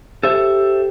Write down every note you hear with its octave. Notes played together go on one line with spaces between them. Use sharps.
G4 A4 C5 E5